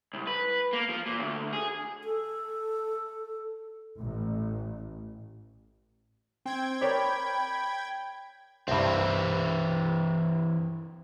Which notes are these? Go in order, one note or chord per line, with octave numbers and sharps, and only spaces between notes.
C2
B4
A#3
F3
A#2
D2
G#4
A4
A1
C4 G5 G#6
A#4 C#5 D5 B5
C2 G2 E3 C4